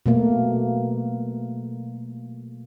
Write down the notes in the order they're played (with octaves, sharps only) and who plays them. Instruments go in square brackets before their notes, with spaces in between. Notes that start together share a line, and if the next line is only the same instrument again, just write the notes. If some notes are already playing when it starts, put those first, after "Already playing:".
[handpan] B2 A3 A#3